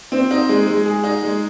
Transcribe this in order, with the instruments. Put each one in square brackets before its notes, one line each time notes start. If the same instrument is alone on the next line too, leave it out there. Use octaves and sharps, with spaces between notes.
[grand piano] C4
D#4
G#3
G#3
G#4
D#4
G#3